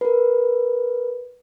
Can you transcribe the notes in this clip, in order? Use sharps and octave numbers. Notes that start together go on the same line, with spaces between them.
A#4 B4